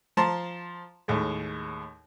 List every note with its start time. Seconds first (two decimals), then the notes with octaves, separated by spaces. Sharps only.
0.17 F3 A5 A#5 C6
1.08 D#2 A2 G#3